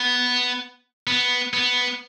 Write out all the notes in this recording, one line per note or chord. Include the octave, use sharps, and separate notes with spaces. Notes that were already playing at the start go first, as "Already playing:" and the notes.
Already playing: B3
B3
B3